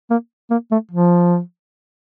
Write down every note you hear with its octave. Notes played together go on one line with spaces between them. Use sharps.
A#3
A#3
A3
F3